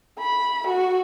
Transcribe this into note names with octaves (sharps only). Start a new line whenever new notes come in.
B5
F#4